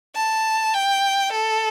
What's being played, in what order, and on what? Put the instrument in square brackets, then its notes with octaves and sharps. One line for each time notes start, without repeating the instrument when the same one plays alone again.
[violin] A5
G5
A4